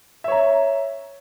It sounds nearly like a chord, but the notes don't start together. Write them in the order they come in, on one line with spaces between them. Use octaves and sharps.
E5 C#5 A#5